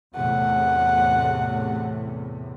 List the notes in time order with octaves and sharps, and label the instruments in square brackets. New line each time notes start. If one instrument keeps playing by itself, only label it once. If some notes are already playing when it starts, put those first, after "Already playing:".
[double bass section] E2 A2 C3 [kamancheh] F#5